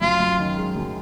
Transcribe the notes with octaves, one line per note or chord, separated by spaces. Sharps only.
F#2 F4
F#2
D#3
G#3
F#2